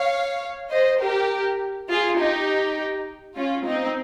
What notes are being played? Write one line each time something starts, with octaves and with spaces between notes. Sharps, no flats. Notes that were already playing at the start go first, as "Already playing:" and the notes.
Already playing: C#5 F5
C5 D#5
G4 A#4
F4 G#4
D#4 G4
C#4 F4
C4 D#4